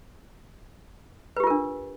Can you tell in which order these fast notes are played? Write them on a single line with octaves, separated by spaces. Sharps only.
B4 G4 F4 A#4 D4